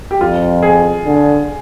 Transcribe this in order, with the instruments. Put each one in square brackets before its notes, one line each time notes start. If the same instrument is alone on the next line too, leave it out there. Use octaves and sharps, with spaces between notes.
[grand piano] G4
[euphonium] F2 [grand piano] F4
[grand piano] G#4
[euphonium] D3